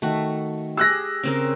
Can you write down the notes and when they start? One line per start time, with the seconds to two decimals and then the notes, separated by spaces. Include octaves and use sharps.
0.02 D#3 A3 F#4
0.77 G4 G#4 E6 F#6 A#6
1.24 C#3 C4 A#4